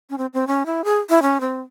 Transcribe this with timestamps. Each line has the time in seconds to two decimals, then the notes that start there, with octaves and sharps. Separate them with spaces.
0.10 C#4
0.18 C4
0.34 C4
0.47 C#4
0.66 E4
0.84 G#4
1.09 E4
1.22 C#4
1.40 C4